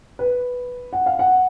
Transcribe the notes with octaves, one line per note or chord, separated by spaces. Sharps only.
B4
F#5
F5
F#5